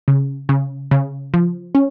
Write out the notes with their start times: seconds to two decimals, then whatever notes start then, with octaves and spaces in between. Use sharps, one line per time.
0.08 C#3
0.49 C#3
0.91 C#3
1.34 F3
1.75 C#4